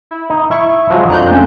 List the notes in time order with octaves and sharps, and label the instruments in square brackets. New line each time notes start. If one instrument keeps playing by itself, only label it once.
[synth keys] E4
[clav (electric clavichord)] D#4
[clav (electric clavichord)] E4 [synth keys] C#6
[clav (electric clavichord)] F3 F#3 G#3
[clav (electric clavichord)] F2 D4 [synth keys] A#5 F#6 G6
[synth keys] A3 C4 C#4